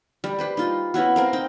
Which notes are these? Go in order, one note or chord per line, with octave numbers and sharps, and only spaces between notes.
G3
G4 B4 C5
D#4 F4
B3 C#4 E4 F#4
C4 A#4 F5
C4 D#4 G5